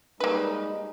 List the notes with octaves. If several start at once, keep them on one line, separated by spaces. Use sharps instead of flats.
G3 G#3 A#3 D#4 B4